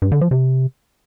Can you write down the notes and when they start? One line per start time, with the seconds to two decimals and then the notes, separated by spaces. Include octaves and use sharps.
0.02 G2
0.12 D3
0.21 F3
0.31 C3